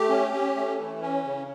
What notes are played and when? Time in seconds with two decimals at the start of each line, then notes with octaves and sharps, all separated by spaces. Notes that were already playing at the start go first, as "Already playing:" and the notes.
Already playing: A3 G4
0.09 C#4
0.32 C#4
0.55 A3
0.78 E3
1.01 C#4
1.24 C#3